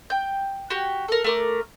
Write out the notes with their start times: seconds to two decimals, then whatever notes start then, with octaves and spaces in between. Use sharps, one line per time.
0.10 G5 G6
0.70 F#4 G4
1.08 A4 A#4
1.24 A3 A#4 D6